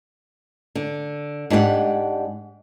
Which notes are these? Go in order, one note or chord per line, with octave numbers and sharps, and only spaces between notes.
D3
G#2 D4 G4 A4 F#5